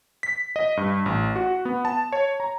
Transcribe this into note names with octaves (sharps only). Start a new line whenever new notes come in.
B6
D#5
G2
A1
F#4
B3
A5
C#5
A#5